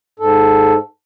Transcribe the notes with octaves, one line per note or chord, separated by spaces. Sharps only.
G#2 A4